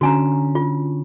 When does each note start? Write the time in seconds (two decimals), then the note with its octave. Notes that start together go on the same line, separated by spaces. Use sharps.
0.01 D3 C#4 F#4 G#5 A#5
0.55 F4